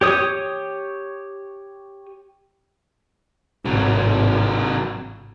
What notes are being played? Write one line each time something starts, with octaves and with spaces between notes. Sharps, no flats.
G4 C#5 D#6
G#1 A2 C3 F#3